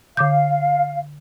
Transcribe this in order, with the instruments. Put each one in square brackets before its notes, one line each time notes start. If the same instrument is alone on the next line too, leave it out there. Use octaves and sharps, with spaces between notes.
[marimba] D3 D6 G6 [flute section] F5